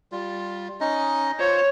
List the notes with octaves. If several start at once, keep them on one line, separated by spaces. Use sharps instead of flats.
G3 F4
C#4 D#4 D#5
F4 C5 C#5